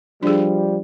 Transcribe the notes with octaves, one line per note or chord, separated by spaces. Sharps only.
F3 G3 D4 G#4